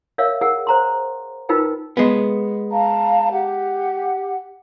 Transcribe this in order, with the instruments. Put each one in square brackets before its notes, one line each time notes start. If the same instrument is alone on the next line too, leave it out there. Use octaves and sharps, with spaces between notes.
[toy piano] A#4 C#5 E5 F5
G#4 A#4 F#5
C5 A#5 C6
D#4 F4 A#4 B4 G5
[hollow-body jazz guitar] G#3 B3
[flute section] F5 A5 A#5
G4 F#5